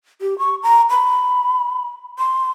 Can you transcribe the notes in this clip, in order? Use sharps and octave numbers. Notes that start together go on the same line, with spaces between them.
G4
C#6
A#5
B5
C6